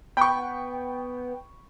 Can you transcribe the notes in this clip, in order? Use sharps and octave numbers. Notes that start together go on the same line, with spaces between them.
B3 G5 B5 C#6